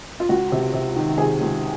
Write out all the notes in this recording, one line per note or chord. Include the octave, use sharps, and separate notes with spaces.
F4
C#2 F#4
C3
C3
D#3
C3 G#4
C#2